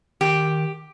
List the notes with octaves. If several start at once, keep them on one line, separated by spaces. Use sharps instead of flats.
D#3 G4